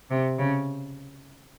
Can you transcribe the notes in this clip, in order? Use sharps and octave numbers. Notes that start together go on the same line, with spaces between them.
C3
C#3